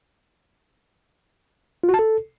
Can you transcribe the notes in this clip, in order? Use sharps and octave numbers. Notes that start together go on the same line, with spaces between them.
F4
F#4
A5
A4